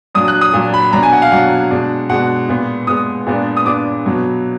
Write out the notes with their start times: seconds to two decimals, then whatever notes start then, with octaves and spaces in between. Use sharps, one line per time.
0.15 A#2 F#3 D4 D#6
0.28 F#6
0.41 D#6
0.53 A#2 F#3 D4
0.74 B5
0.93 B2 F#3 D4 A#5
1.03 G#5
1.13 F#5
1.22 F5
1.31 B2 F#3 D4 F#5
1.71 B2 G#3 D4
2.09 B2 G#3 D4 F#5
2.49 A#2 G#3 B3
2.87 A#2 G#3 B3 D#6
3.26 A#2 G#3 B3 D4
3.57 D#6
3.66 A#2 G#3 B3 D4 D6
4.05 B2 F#3 B3